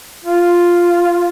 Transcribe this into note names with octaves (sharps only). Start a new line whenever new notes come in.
F4